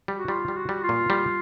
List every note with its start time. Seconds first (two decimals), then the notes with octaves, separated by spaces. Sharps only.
0.08 G3
0.18 F#4
0.28 G3 F4
0.48 G3
0.56 F#4
0.69 G3
0.83 F4
0.89 A#2
1.10 G3